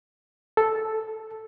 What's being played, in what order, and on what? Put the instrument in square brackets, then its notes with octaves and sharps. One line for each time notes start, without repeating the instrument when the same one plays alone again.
[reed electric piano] A4